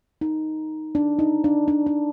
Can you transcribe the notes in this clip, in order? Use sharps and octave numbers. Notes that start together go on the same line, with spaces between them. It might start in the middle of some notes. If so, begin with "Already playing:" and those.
D#4
D4
D#4
D4
D4
D4